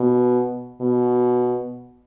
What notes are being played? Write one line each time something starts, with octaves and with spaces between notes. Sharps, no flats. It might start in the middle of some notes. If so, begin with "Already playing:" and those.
Already playing: B2
B2